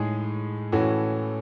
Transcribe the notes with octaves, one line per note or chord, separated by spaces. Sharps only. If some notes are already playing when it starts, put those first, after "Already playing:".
Already playing: A2 G#3 D#4 G#4 C#5
A2 E3 A3 C#4 F#4